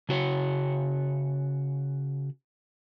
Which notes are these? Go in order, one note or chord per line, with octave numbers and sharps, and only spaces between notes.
C#3 F#4 C#5